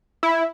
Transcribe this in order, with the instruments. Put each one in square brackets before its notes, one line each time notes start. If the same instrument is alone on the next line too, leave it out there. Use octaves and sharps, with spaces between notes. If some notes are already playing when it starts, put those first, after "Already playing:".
[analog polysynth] E4